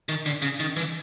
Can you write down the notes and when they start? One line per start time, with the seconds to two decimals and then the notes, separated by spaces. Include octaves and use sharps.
0.09 D#3
0.26 D3
0.42 C#3
0.60 D#3
0.76 E3